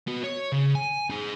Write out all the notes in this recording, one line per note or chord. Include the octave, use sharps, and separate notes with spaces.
B3 F#4
C#5
C#3
G#5
D#4 G#4